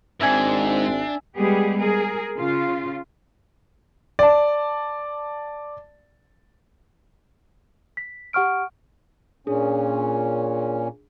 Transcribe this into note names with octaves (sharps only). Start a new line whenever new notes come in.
G#1 G#2 C4 D4 E5 G#5
G3 G#3 B3 G4 G#4
G#4 A#4
C#3 F4
D5 A5
B6
G4 F#5 C#6 F6 D7
A#2 C#4 D4 G#4